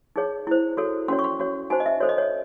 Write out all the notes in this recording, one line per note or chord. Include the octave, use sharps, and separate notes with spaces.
D#4 G#4 C#5
E4 C5
F#4 A4 C#5
C#4 F#4 C#5 C6
C#6
C6
F#4 C#5
D#4 F#4 C5 G#5
D#5
E5
F#4 A4 C5 C#5
D#5
C#5